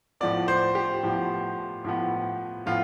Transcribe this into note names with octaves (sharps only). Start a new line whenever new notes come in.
A2 F3 B3 D5
C5
G4
A2 F3 B3
A2 F3 B3
A2 F3 B3 F4